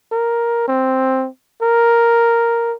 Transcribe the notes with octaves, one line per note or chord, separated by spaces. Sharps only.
A#4
C4
A#4